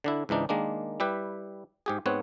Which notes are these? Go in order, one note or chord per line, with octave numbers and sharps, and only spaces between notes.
D3 D4 E4
C#2 G#2 E3 D4 D#4
D#3 G#3 A#3 D4
G3 E4 G4 B4
G#2 G4 G#4
G#2 B3 C4 C#5 F#5